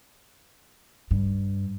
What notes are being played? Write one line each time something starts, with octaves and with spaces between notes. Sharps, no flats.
G2